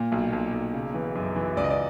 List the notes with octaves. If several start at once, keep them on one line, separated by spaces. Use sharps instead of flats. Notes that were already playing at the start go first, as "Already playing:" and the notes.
Already playing: A#2
B1
B1
B1
C#3
E3
F#2
E3
C#2 D5
D#5
D5